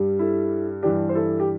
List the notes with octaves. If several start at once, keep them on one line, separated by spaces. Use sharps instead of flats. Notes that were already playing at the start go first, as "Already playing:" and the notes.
Already playing: G2 G3
E4 A4
G2 E3 G3 D4 G4
C5
E4 A4
G4